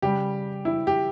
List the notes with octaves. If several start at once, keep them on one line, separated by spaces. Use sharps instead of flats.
C#3 G3 G4
E4
G4